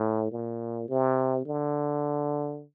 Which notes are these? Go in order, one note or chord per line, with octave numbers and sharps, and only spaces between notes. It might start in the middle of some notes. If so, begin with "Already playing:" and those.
Already playing: A2
A#2
C3
D3